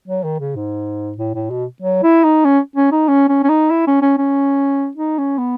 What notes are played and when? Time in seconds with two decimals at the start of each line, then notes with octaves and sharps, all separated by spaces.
0.08 F#3
0.24 D#3
0.40 C#3
0.56 G#2
1.18 A2
1.34 A2
1.50 B2
1.82 F#3
2.03 E4
2.24 D#4
2.45 C#4
2.76 C#4
2.92 D#4
3.08 C#4
3.29 C#4
3.43 C#4
3.49 D#4
3.70 E4
3.87 C#4
4.02 C#4
4.18 C#4
4.97 D#4
5.18 C#4
5.38 B3